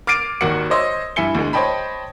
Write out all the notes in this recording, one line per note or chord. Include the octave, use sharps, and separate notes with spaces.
D6 F6 A6 C7 D7 D#7
G#1 D#2 D#3 F#4 F#5 C#7
C5 C#5 D#5 C6 E6
G2 E4 E5 G#5 C#7 G7
D2 G#3
C5 C#5 D#5 G5 A5 B5